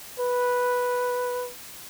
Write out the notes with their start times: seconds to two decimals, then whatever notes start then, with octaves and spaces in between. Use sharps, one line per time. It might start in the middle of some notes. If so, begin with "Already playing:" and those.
0.20 B4